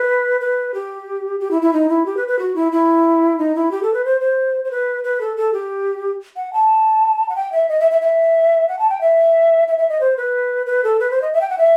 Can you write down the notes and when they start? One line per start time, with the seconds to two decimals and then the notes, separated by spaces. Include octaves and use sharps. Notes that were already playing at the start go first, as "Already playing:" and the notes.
Already playing: B4
0.41 B4
0.74 G4
1.40 G4
1.51 E4
1.62 E4
1.73 D#4
1.89 E4
2.06 G4
2.17 B4
2.28 B4
2.39 F#4
2.56 E4
2.72 E4
3.38 D#4
3.55 E4
3.71 G4
3.83 A4
3.94 B4
4.05 C5
4.21 C5
4.64 C5
4.71 B4
5.04 B4
5.21 A4
5.37 A4
5.53 G4
6.36 F#5
6.53 A5
7.29 F#5
7.36 G5
7.52 E5
7.69 D#5
7.80 E5
7.91 E5
8.02 E5
8.68 F#5
8.79 A5
8.90 G5
9.01 E5
9.68 E5
9.78 E5
9.89 D#5
10.01 C5
10.17 B4
10.66 B4
10.84 A4
11.00 B4
11.11 C5
11.22 D#5
11.33 E5
11.41 G5
11.50 F#5
11.58 E5